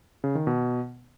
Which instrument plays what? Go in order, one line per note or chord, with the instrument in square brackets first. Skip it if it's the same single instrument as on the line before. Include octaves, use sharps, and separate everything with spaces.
[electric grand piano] C#3
D#3
B2